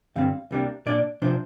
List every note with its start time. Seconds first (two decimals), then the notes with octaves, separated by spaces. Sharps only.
0.16 G2 D3 G3 C4 F5
0.51 C2 C3 G3 A#3 D4
0.86 A#2 A#3 D4 D5
1.22 C3 F3 D4 C5